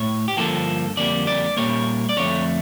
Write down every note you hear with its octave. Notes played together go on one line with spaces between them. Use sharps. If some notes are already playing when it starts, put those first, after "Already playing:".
Already playing: A2 C#5
G4
G2 D3 F3 A#3 A4
F2 D3 G3 A#3 D5
D5
A#2 G3 A#3 C#5
D5
F2 D3 A3 C#5